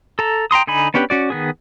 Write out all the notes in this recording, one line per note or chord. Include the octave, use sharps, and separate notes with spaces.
A4 A#5
G5 A#5 C6 D#6
D3 D#4 G#5 B5
B3 C#4 D4 G4 B4
C#4 F#4 D5
D#3 B3 G#4